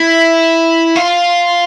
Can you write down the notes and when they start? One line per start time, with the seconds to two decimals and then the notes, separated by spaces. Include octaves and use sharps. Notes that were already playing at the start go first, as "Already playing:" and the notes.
Already playing: E4
0.95 F4